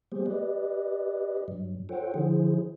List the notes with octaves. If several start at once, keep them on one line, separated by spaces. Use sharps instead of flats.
G3 A3 B3 G4 G#4 C5
G4 B4 D5 D#5
G2 F#3
F4 A4 C5 C#5 F#5 G5
D3 F3 E4 G#4 C5